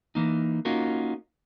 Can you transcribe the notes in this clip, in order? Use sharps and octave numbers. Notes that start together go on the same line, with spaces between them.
E3 A#3 D#4
A#3 C#4 D#4 F4 F#4 A#4